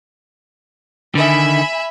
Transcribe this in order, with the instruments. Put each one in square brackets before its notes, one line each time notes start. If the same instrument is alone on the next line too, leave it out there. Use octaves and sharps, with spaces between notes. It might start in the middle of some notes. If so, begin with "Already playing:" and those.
[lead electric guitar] D3 D#3 [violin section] E5 G#5 B5